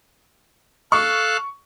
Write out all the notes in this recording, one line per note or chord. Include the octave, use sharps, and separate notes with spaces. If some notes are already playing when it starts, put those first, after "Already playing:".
A4 F5 C#6 F#6